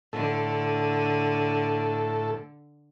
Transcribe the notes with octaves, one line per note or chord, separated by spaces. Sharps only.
A2 D3 A4